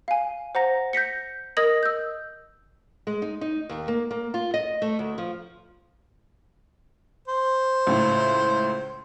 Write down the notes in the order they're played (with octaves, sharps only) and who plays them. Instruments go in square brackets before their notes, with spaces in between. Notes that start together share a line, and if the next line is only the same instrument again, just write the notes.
[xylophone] F5 G#5
C5 F#5 A#5 A#6
G6 A#6 B6 C#7
A#4 D#5 D#6 G#6 A#6 F#7
E6 G6
[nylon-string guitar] G#3
D#4
D#4
D#2
A#3
A#3
F4
D#5
A3
D2
F3
[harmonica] C5
[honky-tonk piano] C#2 A2